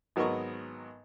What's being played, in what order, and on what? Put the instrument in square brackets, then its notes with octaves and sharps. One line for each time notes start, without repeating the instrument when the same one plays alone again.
[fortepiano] G#1 F#3 B3 A#4 D#5 C#6